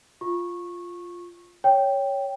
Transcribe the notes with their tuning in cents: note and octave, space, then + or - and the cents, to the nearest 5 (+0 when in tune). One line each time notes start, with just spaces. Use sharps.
F4 +0 C#6 -15
C#5 +5 G5 +0